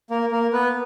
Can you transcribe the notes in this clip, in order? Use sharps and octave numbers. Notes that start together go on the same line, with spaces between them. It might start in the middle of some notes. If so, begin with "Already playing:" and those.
A#3 A#4
A#3 A#4
B3 B4